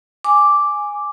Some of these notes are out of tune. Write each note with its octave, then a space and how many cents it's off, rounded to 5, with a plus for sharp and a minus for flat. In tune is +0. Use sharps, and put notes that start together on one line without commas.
G#5 +0 D6 +0